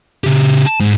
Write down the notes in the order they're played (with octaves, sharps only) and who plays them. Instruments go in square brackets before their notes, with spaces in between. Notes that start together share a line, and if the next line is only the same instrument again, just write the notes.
[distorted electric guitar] C#3 G4
A5
G#2